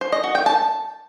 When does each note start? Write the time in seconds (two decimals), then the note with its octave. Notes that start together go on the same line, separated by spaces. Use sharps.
0.01 C5
0.12 D#5
0.24 F#4
0.35 G5
0.46 A5